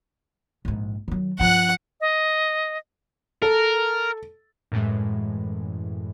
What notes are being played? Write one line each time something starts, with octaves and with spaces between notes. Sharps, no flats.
A#1 G#2
D#3 F#3
G2 F3 F#5 F#6
D#5
A4 A#4
F#2 A2 E3 G#3